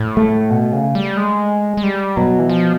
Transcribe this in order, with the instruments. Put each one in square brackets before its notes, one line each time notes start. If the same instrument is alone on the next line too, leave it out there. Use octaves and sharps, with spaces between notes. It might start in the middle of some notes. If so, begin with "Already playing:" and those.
Already playing: [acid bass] A2
[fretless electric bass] A3
[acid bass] B2
C#3
G3
G#3
G#3
G3
[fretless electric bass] B2 [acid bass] F#3
[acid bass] E3
F3